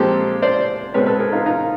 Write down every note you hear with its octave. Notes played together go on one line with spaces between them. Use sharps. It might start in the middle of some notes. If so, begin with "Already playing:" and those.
Already playing: A#2 F3 G#3 C4 G4 A4
C5 D5
B2 G#3 C4 B4 C#5
A4 B4
G#4 A#4
D#4 F4
D#4 F4